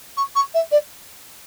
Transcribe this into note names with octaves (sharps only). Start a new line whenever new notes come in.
C#6
C#6
E5
D5